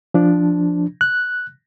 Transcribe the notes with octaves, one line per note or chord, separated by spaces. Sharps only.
F3 D4
F#6